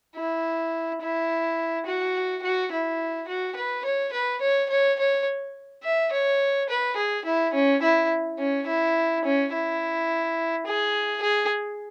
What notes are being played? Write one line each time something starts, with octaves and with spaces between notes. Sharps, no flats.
E4
E4
F#4
F#4
E4
F#4
B4
C#5
B4
C#5
C#5
C#5
E5
C#5
B4
G#4
E4
C#4
E4
C#4
E4
C#4
E4
G#4
G#4